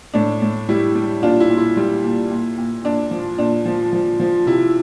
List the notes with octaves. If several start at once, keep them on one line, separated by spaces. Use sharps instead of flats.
A2 D4
A2
G3 E4
G3
A#2 D4 F4
E4
A#2
E4
G3
A#2
A#2
A#2
A#2 D4
F3
A#2 D4
F3
F3
F3
C3 E4